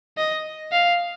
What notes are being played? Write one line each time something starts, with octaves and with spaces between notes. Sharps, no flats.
D#5
F5